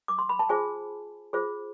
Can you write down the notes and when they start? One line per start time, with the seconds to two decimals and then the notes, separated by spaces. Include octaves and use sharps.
0.08 D6
0.18 C6
0.29 B5
0.39 A5
0.49 F4 G#4 C5 G#5
1.33 F4 G#4 C5